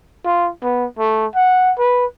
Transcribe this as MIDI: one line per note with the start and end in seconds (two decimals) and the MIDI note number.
0.25 0.49 65
0.63 0.85 59
0.99 1.26 57
1.35 1.72 78
1.78 2.06 71